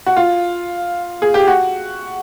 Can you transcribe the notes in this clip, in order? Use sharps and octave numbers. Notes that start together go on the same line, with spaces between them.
F#4
F4
G#4
G4
F#4